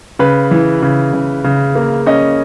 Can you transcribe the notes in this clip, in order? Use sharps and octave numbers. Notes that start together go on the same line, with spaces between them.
C#3 B4
E3
C#3
C#3
C#3
A#3
C#4 D#5